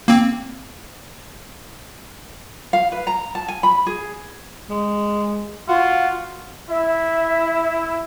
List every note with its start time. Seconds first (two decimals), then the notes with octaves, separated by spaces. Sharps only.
0.08 A#3 C4
2.73 F5
2.92 B4
3.07 A#5
3.35 A5
3.48 G#5
3.63 B5
3.86 G#4
4.70 G#3
5.69 F4 F#4
6.69 E4 E5